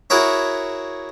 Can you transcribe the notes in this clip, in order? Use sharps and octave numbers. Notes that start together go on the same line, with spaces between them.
E4 F#4 G#4 A#4 C#5 E5